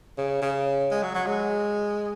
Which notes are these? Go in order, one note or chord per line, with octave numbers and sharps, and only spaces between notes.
C#3
C#3
G#3
F#3
F#3
G#3